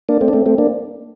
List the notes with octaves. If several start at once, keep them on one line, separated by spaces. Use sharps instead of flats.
A#3 D4
A3 C4
D4
A3 C4
A3 C4
A#3 D4